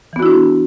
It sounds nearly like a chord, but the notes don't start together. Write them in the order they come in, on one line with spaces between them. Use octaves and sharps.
E3 B3 F#4 E4 D4